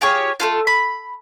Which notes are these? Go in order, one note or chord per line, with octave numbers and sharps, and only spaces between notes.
F4 G4 G#4 C#5
A3 C#4 F4
B5